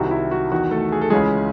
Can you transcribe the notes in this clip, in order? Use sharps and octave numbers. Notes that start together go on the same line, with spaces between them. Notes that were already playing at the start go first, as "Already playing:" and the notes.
Already playing: C2 C3 D#3 F#4
E4
F#4
E2 D#3 F#4
A3 A4
G#4
A4
C#2 C#3 E3 G#3 G#4